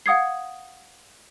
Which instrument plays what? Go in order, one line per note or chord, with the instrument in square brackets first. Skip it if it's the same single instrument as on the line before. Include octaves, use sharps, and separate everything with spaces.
[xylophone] F5 F#5 D#6 G#6 C7